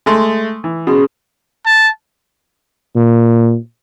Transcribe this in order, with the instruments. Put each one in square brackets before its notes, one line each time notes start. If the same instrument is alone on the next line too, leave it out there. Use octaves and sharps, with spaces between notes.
[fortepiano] G#3 A3 C6
E3
[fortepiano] B2 [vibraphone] C#4 G#4 C6
[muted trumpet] A5
[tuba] A#2